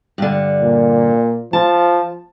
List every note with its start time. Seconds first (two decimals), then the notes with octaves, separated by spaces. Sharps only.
0.18 G2 D3
0.61 A#2
1.53 F3 A5